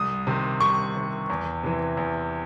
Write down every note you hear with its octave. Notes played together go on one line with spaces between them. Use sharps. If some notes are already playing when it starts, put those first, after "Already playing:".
Already playing: C2 D#6
C3 D#3
C2 C#6
C3 D#3
E2
C3 E3
E2